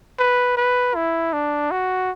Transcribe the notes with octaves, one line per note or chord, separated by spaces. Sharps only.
B4
B4
E4
D4
F#4